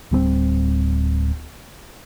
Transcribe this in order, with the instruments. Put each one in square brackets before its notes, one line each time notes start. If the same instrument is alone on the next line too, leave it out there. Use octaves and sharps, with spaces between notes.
[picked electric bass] D1 G3 G#3 C4